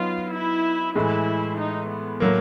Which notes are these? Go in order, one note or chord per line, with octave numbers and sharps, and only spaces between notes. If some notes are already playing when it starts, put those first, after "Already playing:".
Already playing: F#3 B3 D#4 F4
E4
A2 E3 G#3 E4
D#4
B3
A2 F#3 A#3